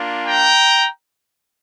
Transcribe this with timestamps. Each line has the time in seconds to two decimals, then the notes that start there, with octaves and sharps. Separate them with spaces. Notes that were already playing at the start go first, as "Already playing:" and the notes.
Already playing: A#3 D4 F4
0.26 G5 A#5